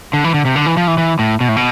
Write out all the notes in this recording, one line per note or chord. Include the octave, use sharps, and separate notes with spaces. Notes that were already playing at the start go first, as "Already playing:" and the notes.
D3
E3
D3
C3
D3
E3
F3
E3
E3
A2
B2
A2
B2